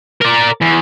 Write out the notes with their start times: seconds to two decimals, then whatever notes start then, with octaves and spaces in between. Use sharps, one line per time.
0.21 A#4 D5
0.61 E2